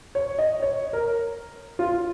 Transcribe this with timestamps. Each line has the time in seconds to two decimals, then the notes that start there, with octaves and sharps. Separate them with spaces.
0.15 C#5
0.39 D#5
0.62 C#5
0.93 A#4
1.79 F4